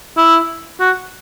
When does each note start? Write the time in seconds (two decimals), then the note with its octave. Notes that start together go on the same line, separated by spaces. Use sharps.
0.17 E4
0.81 F#4